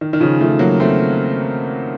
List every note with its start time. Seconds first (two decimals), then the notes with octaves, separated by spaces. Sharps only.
0.01 D#3
0.13 D#3
0.20 C#3 F3
0.41 F3 A3
0.59 F#3 A#3
0.80 A3 C4